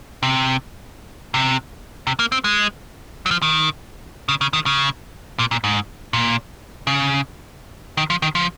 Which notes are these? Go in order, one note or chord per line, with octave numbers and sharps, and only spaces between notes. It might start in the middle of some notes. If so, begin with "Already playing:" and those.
C3
C3
C3
A#3
C4
G#3
F#3
F3
D#3
C#3
C#3
D#3
C#3
A#2
A#2
G#2
A#2
C#3
D#3
F3
D#3
F3